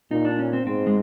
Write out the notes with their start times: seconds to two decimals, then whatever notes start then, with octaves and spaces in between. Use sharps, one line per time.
0.11 A#2 D#4
0.25 D4
0.39 C#4
0.53 C4
0.67 G#2 C4
0.87 G#3